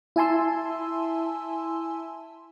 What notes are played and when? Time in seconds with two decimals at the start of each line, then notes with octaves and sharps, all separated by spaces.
0.16 E4 E5 G#5 A5 C6 E6